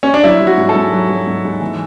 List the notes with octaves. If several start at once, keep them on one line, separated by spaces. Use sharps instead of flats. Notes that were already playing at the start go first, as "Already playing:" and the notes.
C#4
D4
F#3 E4
F#3
F#4
G#2
A4
G#2
F#3
F#3
G#2
G#2
E3